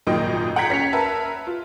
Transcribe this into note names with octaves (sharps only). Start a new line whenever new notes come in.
G#1 F#2 A#2 D#3 D#5 G5
F#5 G5 A#5 G#6 B6
C#4 B6 C#7 F7
A#4 B4 E5 A5
F4